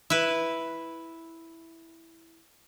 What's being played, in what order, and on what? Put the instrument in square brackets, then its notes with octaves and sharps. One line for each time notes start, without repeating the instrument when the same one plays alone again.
[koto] E4 B4